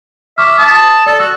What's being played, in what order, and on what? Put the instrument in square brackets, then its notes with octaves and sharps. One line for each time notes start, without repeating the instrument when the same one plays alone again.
[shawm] E5 [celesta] C#6 D6 F6
[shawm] A5 [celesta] D#6
[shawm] A4 [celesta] D5
[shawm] F#4 [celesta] E6